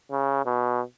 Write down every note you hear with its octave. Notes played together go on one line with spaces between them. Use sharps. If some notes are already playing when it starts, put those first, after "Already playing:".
C#3
B2